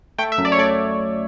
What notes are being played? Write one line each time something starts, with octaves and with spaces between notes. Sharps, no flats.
A3 G5
E5
F#2
D5
C#5
A3 D5